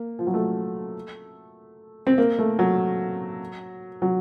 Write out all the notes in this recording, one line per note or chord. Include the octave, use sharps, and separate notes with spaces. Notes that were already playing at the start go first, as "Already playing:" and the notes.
Already playing: A#3
F3
F#3
A3
C4
A#3
A3
F#3
F#3